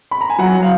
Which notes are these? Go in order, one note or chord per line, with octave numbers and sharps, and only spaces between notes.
B5
A#5
G#5
F#3 F#5
F5